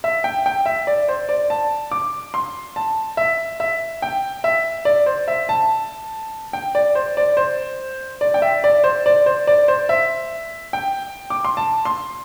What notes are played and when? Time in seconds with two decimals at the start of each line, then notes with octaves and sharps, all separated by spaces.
0.04 E5
0.24 G5
0.46 G5
0.66 E5
0.87 D5
1.08 C5
1.29 D5
1.50 A5
1.91 D6
2.34 C6
2.76 A5
3.17 E5
3.60 E5
4.02 G5
4.44 E5
4.85 D5
5.06 C5
5.28 E5
5.49 A5
6.53 G5
6.75 D5
6.95 C5
7.17 D5
7.37 C5
8.21 D5
8.34 G5
8.42 E5
8.64 D5
8.84 C5
9.06 D5
9.26 C5
9.47 D5
9.68 C5
9.89 E5
10.73 G5
11.30 D6
11.45 C6
11.57 A5
11.85 C6